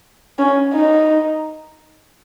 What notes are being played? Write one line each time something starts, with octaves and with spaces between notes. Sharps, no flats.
C#4
D#4